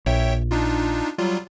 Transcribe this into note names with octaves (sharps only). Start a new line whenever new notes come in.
A#1 C#5 E5 G5
D4 D#4 F4
F#3 G3 F4